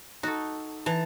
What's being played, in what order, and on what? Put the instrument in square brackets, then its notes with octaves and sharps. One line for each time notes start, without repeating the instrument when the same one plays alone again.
[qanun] D#4 [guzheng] F#4 A4
[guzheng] E3 [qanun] A5 A#5